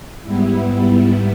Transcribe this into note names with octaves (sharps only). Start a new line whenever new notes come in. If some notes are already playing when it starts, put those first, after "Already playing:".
G#2 G3 B3 E4